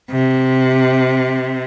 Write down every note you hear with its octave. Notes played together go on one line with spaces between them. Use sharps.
C3